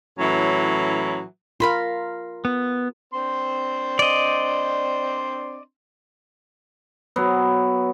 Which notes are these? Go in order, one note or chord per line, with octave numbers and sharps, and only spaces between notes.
A2 E3 F#3 C#4
F4 A#4 F5 B5 C6
B3
C4 D4 C6
D5 D#5
F#3 B3